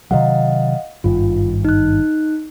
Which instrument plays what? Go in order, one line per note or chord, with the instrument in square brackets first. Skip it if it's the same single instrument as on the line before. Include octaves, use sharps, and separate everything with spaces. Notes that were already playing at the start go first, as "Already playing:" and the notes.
[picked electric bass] C3 D#3 F#3 [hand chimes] D#5 F5 F#5
[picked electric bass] G#1 G2 D#3 [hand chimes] F4
[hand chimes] D#4 F#6